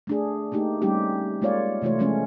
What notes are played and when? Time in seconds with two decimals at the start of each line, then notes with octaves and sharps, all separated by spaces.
0.07 A3 D4 G#4
0.52 A3 A#3 D#4 G4
0.82 G3 A3 C4 C#4 D#4 G4
1.42 G#3 A#3 F4 C#5 D5 F5
1.82 C3 E3 A3 F4 C#5
1.99 F3 G#3 A3 C#4 C#5